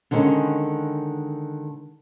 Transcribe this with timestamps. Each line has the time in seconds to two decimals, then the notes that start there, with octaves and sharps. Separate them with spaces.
0.11 D3 D#3 G#3 C#4